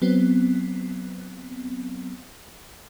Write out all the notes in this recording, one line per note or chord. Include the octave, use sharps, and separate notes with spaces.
F#3 B3 C4